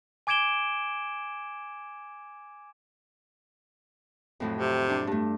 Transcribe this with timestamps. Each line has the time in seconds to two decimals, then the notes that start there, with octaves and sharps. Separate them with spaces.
0.27 G#5 D6 G#6 D7 E7 G7
4.40 F2 A2 F#3
4.57 C3
4.89 D4
5.07 G2 A3